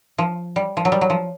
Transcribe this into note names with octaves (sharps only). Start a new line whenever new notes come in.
F3
G3
F3
F#3
G3
F#3
F3